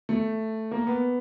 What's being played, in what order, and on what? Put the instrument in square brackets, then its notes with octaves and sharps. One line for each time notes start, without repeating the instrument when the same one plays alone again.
[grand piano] A3
A#3
B3